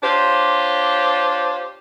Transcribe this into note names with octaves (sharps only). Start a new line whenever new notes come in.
D4 F4 G4 C5 C#5